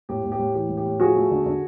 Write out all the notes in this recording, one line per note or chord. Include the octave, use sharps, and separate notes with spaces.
A2 G4
A2
G4
A2
E3 G4
A2
G4
A2
F3 F#4 G#4
A3
D3
D3